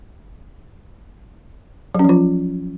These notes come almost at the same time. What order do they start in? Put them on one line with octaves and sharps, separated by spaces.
F#3 C#4 F3 F4